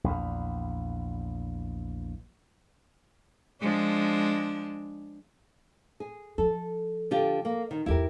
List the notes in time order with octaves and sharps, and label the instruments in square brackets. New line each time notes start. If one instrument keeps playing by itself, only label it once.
[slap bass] A#1 E2
[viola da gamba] F3 G#3 D4
[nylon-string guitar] G#4
[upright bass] F3 [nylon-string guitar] A4
[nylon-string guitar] D3 F4 G4
A#3
D#3
[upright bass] G#1 E2 [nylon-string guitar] E4 G4 A#4